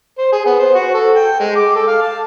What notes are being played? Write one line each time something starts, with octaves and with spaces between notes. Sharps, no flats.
C5
G#4
B3
C5
F#4
A4
G5
G#3
D6
A4
F5
A5